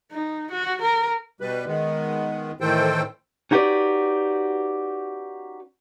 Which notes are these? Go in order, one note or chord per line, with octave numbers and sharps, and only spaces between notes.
D#4
F#4
A#4
B2 G3 B4
D#3 G#3 B3
A2 D#3 E3 A4 C5 G5
C#4 D#4 F#4 G4 B4 D5